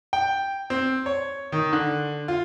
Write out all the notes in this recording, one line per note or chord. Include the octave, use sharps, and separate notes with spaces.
G5
C4
C#5
D#3
D3
F4